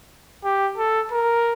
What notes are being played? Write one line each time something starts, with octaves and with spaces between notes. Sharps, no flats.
G4
A4
A#4